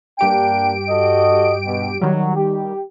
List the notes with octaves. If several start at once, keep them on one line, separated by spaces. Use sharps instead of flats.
G2 A#3 D4 G4 G5 D7
F#4 A4 D#5
B2
D#3 F#3 G3
G4